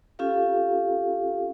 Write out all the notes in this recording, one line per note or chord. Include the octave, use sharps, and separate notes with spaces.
C#4 F4 G4 A4 F5